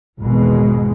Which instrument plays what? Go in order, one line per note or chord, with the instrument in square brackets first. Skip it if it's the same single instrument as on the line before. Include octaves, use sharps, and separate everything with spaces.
[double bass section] G#1 E2 B2 G#3